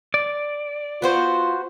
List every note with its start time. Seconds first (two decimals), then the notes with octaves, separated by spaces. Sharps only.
0.14 D5
1.02 B3 F4 F#4 C5